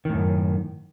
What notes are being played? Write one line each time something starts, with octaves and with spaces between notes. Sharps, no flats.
F#2 A2 D#3